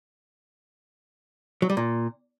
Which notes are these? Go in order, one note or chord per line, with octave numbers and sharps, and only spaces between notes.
F#3
G3
A#2